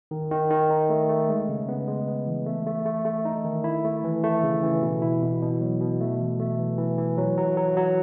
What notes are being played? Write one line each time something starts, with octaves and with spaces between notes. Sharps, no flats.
D#3
D#3
D#3
D#4
A3
A3
G#3
C#3
B3
G#3
B3
E3
A3
A3
A3
A3
D#4
D#3
E4
A3
E3
A3
C#3
E3
B2
E4
B2
B2
F#3
B2
A3
E3
A3
E3
E3
E3
F#3
F#3
F#3
F#3